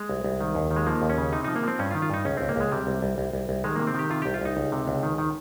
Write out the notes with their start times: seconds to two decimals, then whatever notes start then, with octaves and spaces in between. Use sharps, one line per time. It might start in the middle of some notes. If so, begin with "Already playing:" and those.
Already playing: G#3
0.09 C2
0.24 C2
0.41 D#3
0.55 D#2
0.71 D#3
0.76 G#3
0.86 F3 A#3
1.02 D#2
1.10 C#4
1.18 C#3
1.33 C3 D#4
1.44 F3 D#4
1.56 A#3
1.63 F3 C4
1.79 G2 C#4
1.91 F4
1.94 D#3
2.02 F4
2.10 G2 D#4
2.25 C#2 C#4
2.37 C#2 C4
2.49 A#3
2.56 C#2 G#3
2.72 C3 G3
2.87 C2
3.02 C2
3.18 C2
3.33 C2
3.49 C2
3.64 D#3 G#3
3.76 C3 A#3
3.87 C4
3.94 D#3 G4
4.10 C3 F4
4.22 C2 G4
4.34 F4
4.41 C2 D#4
4.57 C#2
4.72 C3
4.88 C#2
5.03 D#3
5.18 D#3